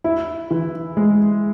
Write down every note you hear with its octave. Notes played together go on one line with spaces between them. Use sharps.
E4
E3
G#3